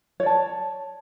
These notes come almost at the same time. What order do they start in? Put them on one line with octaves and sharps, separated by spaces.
C#5 D5 A5